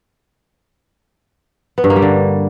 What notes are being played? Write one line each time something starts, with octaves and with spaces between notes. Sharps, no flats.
B3
G2
A#3
G3
D3